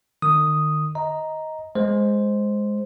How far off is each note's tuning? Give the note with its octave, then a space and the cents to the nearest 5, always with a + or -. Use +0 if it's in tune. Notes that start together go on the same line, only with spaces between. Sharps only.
D#3 -40 D#6 +0
D#5 +15 A#5 +0
G#3 +0 C5 +0